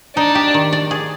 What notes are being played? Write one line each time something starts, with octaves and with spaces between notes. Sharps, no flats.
D4 D#4
G4
D#3
D5
G#4